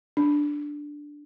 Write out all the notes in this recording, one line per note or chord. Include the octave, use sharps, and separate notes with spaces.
D4